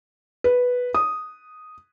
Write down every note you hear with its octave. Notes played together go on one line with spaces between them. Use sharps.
B4
D#6